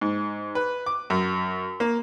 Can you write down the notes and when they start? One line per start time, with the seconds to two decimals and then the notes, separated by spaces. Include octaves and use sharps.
0.01 G#2
0.55 B4
0.86 D6
1.10 F#2
1.80 A#3